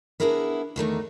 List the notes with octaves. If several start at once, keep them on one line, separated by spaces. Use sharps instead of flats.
B3 D4 E4 G#4 A#4 B4
E2 D#3 A3 D#4